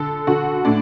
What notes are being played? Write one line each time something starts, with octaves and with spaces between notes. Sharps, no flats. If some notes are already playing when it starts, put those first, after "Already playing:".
Already playing: D3 A4
D3 F#4
A2 D4